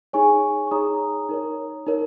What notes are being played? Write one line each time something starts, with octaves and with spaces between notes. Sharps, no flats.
D#4 G#4 C#5 G#5 C#6
C#6
D#4 G#4 C#5 A#5 D#6
D#4 A#4 C#5
D#4 A#4 C#5